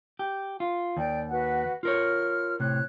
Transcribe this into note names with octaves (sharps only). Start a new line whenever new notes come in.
G4
F4
D#2 D5 G5 G6
F#4 B4 F#5
F4 A#4 C#5 F6
A2 C3 C#5 F#6